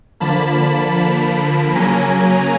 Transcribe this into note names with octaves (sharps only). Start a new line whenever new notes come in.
D3 F3 A#3 A5 B5
C#3 F#3 A#3 C#4 G#5 A#5